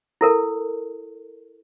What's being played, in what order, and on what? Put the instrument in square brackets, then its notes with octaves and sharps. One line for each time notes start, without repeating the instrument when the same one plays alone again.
[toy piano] E4 A4 A#4